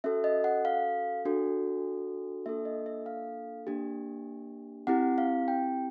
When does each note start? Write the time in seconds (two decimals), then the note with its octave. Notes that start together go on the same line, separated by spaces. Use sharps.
0.04 C#4 F#4 A4 E5
0.24 D#5
0.44 F#5
0.65 F5
1.25 D4 F#4 A4
2.46 A#3 D4 F4 A4 E5
2.65 D#5
2.86 E5
3.06 F5
3.67 A#3 D4 G4
4.87 C4 E4 G4 F#5
5.18 F5
5.48 G5